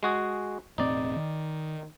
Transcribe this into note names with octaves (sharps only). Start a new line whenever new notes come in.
G#3 F#4 G#4
E1 A2 C4 D#4 D5
D#3